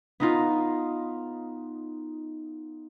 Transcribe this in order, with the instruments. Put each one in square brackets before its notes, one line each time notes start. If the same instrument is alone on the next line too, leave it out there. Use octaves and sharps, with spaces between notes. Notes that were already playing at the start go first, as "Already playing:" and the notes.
[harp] B3 D#4 F4